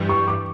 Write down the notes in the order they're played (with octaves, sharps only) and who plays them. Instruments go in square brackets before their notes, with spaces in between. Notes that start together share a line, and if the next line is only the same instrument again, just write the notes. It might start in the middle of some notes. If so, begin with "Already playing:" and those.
Already playing: [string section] G2 E3 G3
[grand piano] C#6
D6